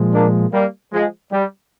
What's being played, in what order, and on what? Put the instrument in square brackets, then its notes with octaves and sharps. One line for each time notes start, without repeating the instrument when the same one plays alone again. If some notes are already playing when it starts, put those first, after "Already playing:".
Already playing: [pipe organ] A#2 F3 G#3
[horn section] A#3 D4
G3 A#3
F3 G#3
G3